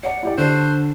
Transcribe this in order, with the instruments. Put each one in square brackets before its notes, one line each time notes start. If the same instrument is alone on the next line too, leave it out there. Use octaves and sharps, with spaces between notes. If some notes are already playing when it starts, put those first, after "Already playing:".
[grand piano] C#5 D5 [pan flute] F#5
[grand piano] E4 G4 D5
[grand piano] D3 [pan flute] D4 [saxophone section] F#4 C5